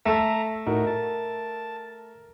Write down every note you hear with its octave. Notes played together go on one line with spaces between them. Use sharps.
A3 E5 A5 A#5 E6
A2 D#4 F#4 A#4
A5